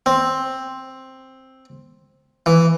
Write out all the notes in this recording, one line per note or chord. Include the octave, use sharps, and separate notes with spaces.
C4
E3